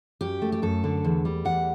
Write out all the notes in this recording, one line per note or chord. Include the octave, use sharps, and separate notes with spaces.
F#2 G4
A3
G4
F#2 A4
D3
E2
G3
E2 F#5